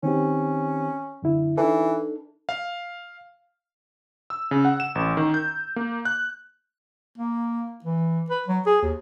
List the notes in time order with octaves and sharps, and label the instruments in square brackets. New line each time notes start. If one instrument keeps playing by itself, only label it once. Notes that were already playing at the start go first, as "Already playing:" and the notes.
[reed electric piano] D#3 C4 G4 [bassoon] C#4
[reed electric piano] F#2 D3 E4
[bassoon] E3 [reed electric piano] D4 D#4 A4
[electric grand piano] F5
E6
C#3
F#5
E7
A1
D#3
G6
A#3
F#6
[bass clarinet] A#3
E3
B4
F#3
G#4
D#2